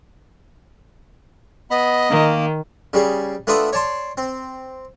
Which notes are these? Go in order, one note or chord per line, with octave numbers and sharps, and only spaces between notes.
B3 D#5 B5
D#3 A#3
C#3 G3 G#4
A3 B3 D4 F4 E5 D#6
C#5 D5 A5 C6
C4